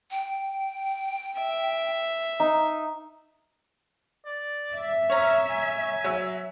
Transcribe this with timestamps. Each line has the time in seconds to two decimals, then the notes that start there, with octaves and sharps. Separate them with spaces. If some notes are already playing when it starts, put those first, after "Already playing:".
0.11 G5
1.38 E5
2.40 D#4
4.26 D5
4.73 E5
5.10 C#4 C#5 A#5
5.49 G#5
6.04 F#3 E6